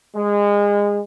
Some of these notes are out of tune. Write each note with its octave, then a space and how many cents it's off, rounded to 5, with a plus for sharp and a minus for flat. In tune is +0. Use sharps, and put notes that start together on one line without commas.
G#3 -25